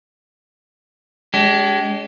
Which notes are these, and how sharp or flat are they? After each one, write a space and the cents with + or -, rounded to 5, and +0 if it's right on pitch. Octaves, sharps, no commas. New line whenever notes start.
G#3 +0 D4 -45 G4 -30